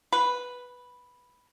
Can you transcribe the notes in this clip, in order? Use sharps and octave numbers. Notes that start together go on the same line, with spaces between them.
B4